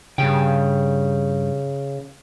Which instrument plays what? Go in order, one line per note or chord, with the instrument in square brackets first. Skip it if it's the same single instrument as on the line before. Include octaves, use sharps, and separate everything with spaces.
[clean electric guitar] G2 G4 G5 [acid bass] C#3